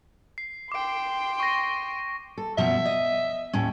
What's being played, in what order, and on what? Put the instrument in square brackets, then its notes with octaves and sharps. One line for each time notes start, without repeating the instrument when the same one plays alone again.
[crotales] C7
[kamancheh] G5 C6 [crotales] D6 D7
[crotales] C#6 A#6
[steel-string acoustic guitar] A4
[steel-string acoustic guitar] F#2 B2 F3 [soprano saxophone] E5
[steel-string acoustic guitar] D#5
D#2 A2 C#4